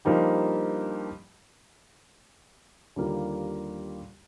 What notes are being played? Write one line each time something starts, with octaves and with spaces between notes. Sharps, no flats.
G2 F3 A#3 D#4 G4
D#2 D3 G3 A#3 F4